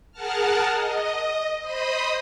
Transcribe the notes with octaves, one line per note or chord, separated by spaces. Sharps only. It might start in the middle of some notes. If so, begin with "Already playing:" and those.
G#4 A#4 F#5 A5 F6
D#5
C5 D#5 B5 D#6